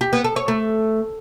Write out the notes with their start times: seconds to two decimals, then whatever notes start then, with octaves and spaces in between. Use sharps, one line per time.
0.01 G4
0.13 B3
0.24 A4
0.36 C#5
0.48 A3